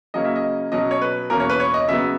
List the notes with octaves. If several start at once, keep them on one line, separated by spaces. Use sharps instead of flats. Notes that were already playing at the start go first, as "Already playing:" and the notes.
C#3 F#3 A#3 C#4 D#5
E5
D#5
B2 F#3 C#4 D#5
C#5
B4
E2 B2 A#3 C#4 A#4
C#5
B4
C#5
D#5
C#3 F#3 B3 E5